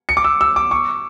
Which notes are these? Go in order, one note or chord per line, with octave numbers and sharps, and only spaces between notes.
C#7
D6
E6
E6
D6
C#6